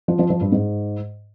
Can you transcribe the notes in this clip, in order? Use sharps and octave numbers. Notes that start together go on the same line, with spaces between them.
F3
F3
F3
G2
G#2